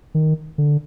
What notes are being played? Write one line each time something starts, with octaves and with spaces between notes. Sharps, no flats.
D#3
D3